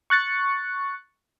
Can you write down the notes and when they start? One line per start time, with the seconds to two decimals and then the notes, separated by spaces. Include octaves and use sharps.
0.10 C#6 F#6 A6 C#7